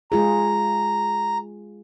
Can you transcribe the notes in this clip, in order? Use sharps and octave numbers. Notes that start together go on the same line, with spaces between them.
G#3 F4 G#4 A#5